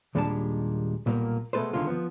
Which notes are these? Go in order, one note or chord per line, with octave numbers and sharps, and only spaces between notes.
D#2 A#2 G3 G#3 D4 A5
B1 A#2 G3 A3 A#3
B2 G#3 A3 A4 B4 C5
C#2 D3 D#3 G#3 F4
F3 B3